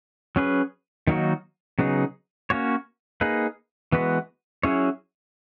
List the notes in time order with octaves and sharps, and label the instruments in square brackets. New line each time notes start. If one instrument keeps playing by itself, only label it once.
[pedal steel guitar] F#3 C#4 G#4 B4
D#3 F#3 A#3 D#4 F#4
C#3 F#3 B3 D#4 G#4
A#3 C#4 F#4 C#5
A#3 D#4 G#4 B4
E3 G#3 B3 F#4 B4
F#3 C#4 E4 G#4 C#5